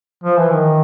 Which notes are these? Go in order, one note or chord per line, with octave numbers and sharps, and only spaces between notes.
F3
E3
D#3